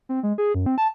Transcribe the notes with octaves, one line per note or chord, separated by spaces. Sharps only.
C4
G#3
G#4
F#2
C4
A5